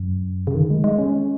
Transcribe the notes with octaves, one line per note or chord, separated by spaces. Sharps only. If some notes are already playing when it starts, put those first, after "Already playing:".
Already playing: F#2
C#3
D#3
G#3
G#3
C#4